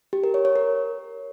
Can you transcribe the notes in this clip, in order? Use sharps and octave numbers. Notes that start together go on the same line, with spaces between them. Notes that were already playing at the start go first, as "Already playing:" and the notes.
G4
A#4
C#5
C#5
A#4